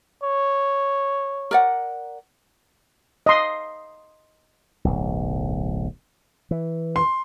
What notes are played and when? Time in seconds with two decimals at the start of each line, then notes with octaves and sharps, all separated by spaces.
0.23 C#5
1.51 A#4 D5 F#5
3.26 D#5 C6
4.85 D1 B1
6.51 E3
6.96 C6